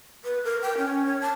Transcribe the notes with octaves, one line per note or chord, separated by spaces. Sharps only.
B4
A#4
G5
C#4
C#5
A5